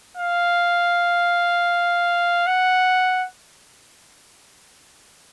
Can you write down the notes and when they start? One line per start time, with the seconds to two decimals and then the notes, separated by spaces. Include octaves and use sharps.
0.17 F5
2.47 F#5